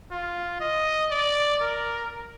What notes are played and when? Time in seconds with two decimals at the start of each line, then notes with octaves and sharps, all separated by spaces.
0.11 F4
0.61 D#5
1.11 D5
1.61 A#4